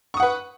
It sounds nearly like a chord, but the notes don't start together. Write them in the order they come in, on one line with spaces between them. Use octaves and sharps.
C#6 D#6 F#5 B4